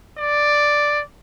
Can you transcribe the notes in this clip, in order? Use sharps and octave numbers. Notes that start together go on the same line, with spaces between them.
D5